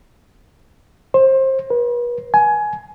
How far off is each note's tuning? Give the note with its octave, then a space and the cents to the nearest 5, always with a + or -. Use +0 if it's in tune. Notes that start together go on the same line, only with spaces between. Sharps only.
C5 +25
B4 -45
G#5 +20